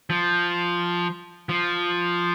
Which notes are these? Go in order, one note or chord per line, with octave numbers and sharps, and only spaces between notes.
F3
F3